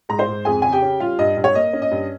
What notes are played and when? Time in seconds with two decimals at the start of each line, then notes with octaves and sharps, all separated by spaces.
0.09 G#2 A#5
0.19 C5 C6
0.28 G#2
0.45 F2 G#4 G#5
0.62 C#3 G#5
0.72 G4 G5
0.82 C#4
1.00 G3 F4 F5
1.19 G2 D#5
1.37 G2
1.44 C#5
1.54 A#3 D#5
1.73 C#4
1.82 D#5
1.91 G2